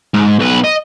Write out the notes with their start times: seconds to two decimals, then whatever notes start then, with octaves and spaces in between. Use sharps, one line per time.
0.14 G#2
0.39 B1 B4
0.64 D#5